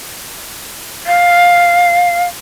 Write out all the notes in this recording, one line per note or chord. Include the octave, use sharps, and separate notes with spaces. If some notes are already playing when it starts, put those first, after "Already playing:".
F5